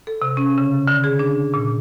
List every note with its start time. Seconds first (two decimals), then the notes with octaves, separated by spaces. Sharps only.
0.07 A4
0.22 C3
0.37 C#4
0.58 C#3
0.88 D3
1.04 G#4
1.19 D4
1.54 A#2